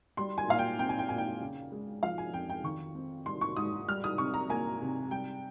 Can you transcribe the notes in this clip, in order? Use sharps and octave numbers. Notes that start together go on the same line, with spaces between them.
G3 C6
G#5
A#2 F5
G5
C4 G5
G#5
G5
A#2 G#5
G5
C#3
G#3
F3 F5
G#5
F2 G5
G5
D#3 C#6
C4
G3 C6
C#6
G#2 D#6
G3 F6
D#6
C3 C#6
A#5
A#3 G#5
C3
G3 G5